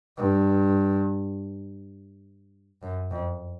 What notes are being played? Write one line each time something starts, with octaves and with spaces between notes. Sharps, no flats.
G2
F#2
F2